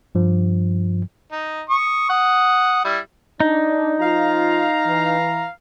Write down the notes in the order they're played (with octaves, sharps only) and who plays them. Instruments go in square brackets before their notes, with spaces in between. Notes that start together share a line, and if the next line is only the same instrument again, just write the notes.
[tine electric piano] G2 F3
[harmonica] D#4
C#6 D#6
F#5 D#6
G3 E4
[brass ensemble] D4 [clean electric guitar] D#4
[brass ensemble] F3 F4 [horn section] F5 A#5
[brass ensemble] E3